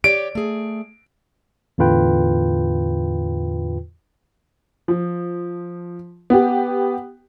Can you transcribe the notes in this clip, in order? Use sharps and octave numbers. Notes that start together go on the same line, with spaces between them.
G4 C#5 D5 D7
A3 G#4
E2 A2 D3 F4 B4 G5
F3
B3 G4